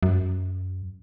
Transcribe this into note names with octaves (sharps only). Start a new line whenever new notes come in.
F#2